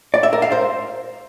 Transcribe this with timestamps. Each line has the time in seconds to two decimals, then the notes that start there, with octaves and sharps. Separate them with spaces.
0.14 D5
0.23 E5
0.33 A#4
0.42 F5
0.52 C5